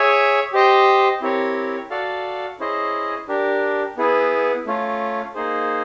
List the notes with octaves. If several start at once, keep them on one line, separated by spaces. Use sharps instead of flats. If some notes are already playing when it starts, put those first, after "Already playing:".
Already playing: G#4 C#5 E5 G#5
G4 C5 D#5 G5
C4 E4 G4 A#4 C#5
F#4 A4 D5 F5
C#4 E4 G#4 C5 D#5
D4 G4 A#4
B3 E4 G#4 B4
A3 C#4 F4
A#3 D#4 G#4 C5